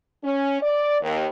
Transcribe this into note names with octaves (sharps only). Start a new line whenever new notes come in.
C#4
D5
D#2